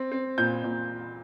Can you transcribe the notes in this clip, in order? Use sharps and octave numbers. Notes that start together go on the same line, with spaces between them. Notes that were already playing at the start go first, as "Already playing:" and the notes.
Already playing: C4
C4
A#2 G6
A#2